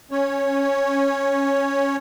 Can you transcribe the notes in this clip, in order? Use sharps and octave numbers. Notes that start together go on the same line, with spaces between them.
C#4 C#5